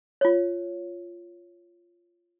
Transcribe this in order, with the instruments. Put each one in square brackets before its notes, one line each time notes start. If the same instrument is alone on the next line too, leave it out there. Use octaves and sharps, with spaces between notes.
[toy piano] F4 C#5